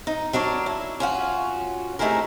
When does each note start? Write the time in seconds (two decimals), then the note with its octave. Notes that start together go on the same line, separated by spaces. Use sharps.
0.07 D#4
0.33 F#3 D4 A#4 C#5
0.66 E4
1.00 C#4 F4 F#4
1.99 C3 A3 D#4 E4 G#4 A#4